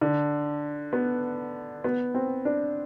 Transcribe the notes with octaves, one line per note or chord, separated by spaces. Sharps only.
D3
B3
B3
C4
D4